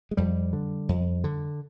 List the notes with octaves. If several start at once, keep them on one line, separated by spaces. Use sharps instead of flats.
G#3
F2 G3
D3
F2
D3